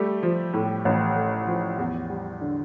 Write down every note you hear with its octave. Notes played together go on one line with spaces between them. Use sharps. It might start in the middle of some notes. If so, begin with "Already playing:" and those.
Already playing: G3 A3 G4
F3
A2
A1
A3
F3
E2
G3
D3